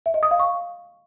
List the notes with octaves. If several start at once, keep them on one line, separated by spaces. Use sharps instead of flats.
E5
D#5
D#6
F5
C#6